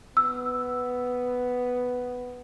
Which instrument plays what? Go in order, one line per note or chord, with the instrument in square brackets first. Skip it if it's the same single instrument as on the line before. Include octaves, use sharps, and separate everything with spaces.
[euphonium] B3 [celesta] E6